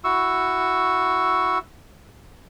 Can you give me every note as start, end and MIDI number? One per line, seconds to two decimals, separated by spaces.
0.04 1.58 64
0.04 1.58 66
0.04 1.58 85
0.04 1.58 88